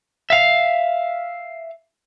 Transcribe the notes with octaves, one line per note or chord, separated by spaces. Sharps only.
E5 F5